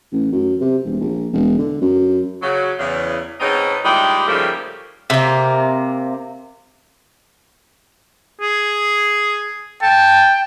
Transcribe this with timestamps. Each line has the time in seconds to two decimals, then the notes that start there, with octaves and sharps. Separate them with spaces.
0.12 A1
0.32 F#2
0.60 C3
0.85 E1
1.00 A#1
1.32 E1
1.58 D3
1.81 F#2
2.42 C#3 F#3
2.78 E2 C#3
3.40 G#2 B2 C4 C#4 D#4
3.84 A#2 D#3 G3 G#3 E4 G4
4.27 G#2 C#3 F3 G3 A3 A#3
5.10 C3 A#3
8.41 G#4
9.82 G5 A5